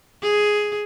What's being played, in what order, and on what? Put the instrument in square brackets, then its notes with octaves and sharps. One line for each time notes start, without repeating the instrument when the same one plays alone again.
[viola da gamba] G#4